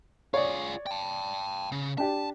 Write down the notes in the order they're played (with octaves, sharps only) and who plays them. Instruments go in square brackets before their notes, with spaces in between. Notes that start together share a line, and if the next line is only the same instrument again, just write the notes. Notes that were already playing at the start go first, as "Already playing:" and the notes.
[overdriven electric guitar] F4 G#4 [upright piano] C#5 D5
[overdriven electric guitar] G5 A5
C#3
[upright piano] D4 G4 [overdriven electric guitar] A5